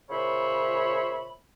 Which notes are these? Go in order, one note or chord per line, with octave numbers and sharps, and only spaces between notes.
A#2 C#3 C5 C#5 E5 B5